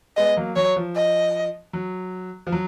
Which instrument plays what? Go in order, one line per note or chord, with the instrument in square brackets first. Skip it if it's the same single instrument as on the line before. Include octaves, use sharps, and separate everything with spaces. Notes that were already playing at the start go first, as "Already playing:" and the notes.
[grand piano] G#3 B3 [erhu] D#5
[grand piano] F#3 A#3
[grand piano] F#3 [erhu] C#5
[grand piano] F3
[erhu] D#5
[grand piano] F#3
F3
F#3